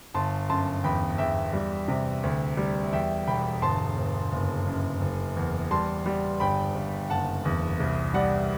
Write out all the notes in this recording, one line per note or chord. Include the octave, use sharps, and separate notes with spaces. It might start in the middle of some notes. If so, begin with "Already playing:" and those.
G1 A5 C6
F#2 A5 C6
E2 G5 B5
E2 E5 G5
G3
C3
D2
G3
E2 E5 G5
E1 G5 B5
G1 A5 C6
G1
F#1
F#2
F#1
E2
G3 A5 C6
G3
G1 G5 B5
G1
F#1 F#5 A5
E2
C2
G3 D5 F#5